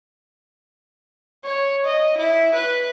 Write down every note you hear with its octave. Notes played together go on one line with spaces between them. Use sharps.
C#5
D#5
E4
B4